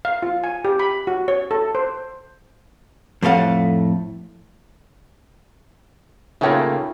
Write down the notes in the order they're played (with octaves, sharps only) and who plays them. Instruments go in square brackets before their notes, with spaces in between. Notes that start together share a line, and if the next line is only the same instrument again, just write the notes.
[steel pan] F5
F4
G#5
G4
B5
F#4
C#5
A4
C5
[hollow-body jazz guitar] F2 A2 A3 F5 F#5
[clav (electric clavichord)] C#3 A3 A#3 [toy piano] D#4 G5 [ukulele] F4 C#5 E5